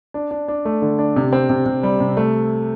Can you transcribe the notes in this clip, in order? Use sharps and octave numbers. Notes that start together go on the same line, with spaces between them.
D4
D4
D4
A3
D3
D4
C3
C4
C3
C3
G3
C3
A3